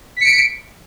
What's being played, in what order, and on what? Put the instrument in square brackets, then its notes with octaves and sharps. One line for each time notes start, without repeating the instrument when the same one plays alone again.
[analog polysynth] B6
C#7
D7